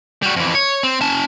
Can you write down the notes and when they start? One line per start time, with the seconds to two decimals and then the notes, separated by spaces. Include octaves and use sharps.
0.23 G3 F#4
0.36 F2 E3
0.55 C#5
0.83 C4
1.01 C#4 A5